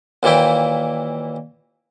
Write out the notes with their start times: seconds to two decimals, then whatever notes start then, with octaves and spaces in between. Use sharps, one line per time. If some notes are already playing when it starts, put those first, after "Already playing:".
0.23 D#2 A#2 E3 E4 G5